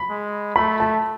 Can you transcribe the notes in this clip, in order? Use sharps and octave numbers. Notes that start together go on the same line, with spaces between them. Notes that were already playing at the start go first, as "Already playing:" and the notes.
Already playing: B5
G#3
A3 B5
A5